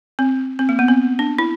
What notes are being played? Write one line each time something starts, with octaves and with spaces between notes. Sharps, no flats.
C4
C4
A#3
B3
C4
D4
E4